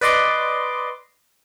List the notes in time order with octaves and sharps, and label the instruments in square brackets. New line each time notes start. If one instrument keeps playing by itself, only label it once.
[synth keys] B4 D5 D#5 C6 D6